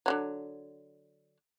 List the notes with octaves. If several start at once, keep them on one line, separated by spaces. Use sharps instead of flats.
D3 D#3 F#3